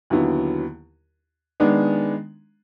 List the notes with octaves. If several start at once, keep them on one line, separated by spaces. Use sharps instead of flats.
D#2 D3 F#3 B3 E4
D#3 G#3 B3 D4